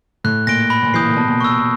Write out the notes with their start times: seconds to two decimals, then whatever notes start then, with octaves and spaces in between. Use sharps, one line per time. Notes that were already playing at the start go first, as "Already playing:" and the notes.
0.24 A2 F#6
0.47 A#2 A#6 D7 G7
0.70 B5
0.83 A#2
0.94 E3 D#6 G6 C7
1.06 A#2
1.17 B2 A5
1.27 A#2
1.41 C#6 E6